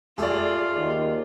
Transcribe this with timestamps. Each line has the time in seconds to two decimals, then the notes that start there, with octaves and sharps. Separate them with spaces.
0.18 A3 F4 G4 G#4 D5
0.76 D#2